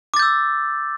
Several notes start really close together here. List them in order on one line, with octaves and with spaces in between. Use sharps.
D6 A6 G6 E6